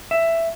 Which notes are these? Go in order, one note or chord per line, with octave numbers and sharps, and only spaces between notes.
E5